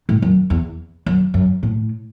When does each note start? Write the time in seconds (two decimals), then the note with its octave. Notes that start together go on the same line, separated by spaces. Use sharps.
0.09 A2
0.22 F#2
0.50 E2
1.06 F#2
1.34 F#2
1.63 A2